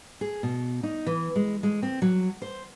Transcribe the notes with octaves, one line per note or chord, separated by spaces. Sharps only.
G#4
B2
D#4
E3
G#3
G#3
C4
F#3
C5